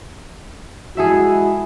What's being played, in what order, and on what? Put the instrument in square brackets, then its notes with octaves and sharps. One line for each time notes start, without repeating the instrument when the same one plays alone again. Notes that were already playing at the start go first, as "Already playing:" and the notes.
[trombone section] G#3 E4 F#4 [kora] G#4 A4 E5